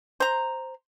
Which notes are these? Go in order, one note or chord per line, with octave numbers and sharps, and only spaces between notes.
C5 A#5